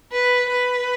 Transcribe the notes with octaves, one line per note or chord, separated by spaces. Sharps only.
B4
B4